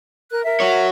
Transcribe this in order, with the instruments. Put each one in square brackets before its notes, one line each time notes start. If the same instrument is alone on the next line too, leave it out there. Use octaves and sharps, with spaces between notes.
[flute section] A#4 F#6
A#4 E5
[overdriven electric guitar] F#4 C#5